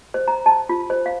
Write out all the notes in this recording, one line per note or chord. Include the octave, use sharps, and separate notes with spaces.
C5
A#5
A5
F4
C5
F5